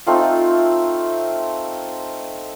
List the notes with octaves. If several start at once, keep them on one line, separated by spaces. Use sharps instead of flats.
A3 C4 D#4 F4